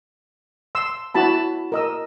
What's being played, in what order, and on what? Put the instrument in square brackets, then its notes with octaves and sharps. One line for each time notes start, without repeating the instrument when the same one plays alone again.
[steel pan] C6 E6
E4 F#4 A5 B5
A#4 D#5 E6